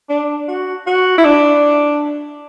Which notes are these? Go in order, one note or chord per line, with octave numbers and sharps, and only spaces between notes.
D4
F#4
F#4
E4
D4